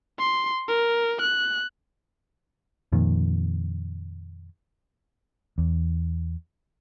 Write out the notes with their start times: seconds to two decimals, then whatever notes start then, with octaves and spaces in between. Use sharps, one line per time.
0.19 C6
0.68 A#4
1.21 F#6
2.92 F2 A#2 D#3
5.58 E2